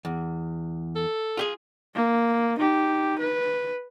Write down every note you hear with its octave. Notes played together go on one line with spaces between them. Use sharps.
E2
A4
F4 G4 G#4
A#3
D#4 G4
B4